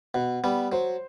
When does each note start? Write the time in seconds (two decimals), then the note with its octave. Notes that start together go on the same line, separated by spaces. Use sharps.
0.14 B2 F#5
0.44 G3 B3
0.72 F#3 C5